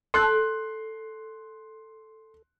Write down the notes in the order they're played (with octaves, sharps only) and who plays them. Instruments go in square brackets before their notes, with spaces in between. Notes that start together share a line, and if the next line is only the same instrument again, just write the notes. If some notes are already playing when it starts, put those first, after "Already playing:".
[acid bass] A4 [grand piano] C6 F#6